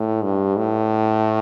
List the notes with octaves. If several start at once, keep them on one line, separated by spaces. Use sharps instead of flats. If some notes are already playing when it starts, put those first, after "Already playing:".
Already playing: A2
G2
A2